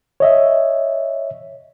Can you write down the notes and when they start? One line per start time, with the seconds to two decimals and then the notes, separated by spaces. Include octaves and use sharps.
0.20 C#5 D#5 E5